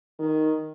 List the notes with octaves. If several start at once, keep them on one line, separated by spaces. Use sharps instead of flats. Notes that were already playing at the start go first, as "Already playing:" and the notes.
D#3